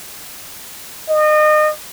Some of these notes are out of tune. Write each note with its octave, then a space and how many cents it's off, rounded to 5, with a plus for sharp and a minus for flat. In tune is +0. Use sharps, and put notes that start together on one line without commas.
D#5 -30